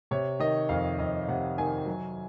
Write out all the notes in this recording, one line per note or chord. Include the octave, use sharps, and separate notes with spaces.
C3 C#5
D#3 D#5
F2 F5
F2 D#5
C3 F#5
D#3 G#5
F#3